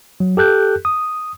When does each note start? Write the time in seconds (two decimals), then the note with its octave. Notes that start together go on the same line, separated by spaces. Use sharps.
0.20 F#3
0.37 G4 A4 F#6 G6
0.85 D#6